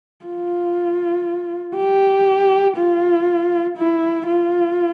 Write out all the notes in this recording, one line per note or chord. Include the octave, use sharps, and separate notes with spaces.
F4
G4
F4
E4
F4